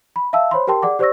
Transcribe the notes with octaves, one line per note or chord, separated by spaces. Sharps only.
B5
E5 F5 A5 E6
C5 C#5 B5 C6
G4 A#4 G5 A5 C6
G#4 D5 F#5 D6
G4 C5 D5 C#6 E6 A#6